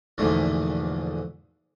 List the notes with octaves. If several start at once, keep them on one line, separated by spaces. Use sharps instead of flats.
A#1 E2 G#2 B2 D3 A3